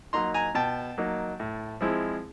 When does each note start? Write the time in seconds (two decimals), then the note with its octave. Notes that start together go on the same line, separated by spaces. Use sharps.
0.13 F#3 A#3 D#4 A#5 C6
0.34 G#5 A#5
0.55 B2 G5 A5
0.98 F#3 A#3 D#4
1.40 A2
1.81 F3 G#3 C4 E4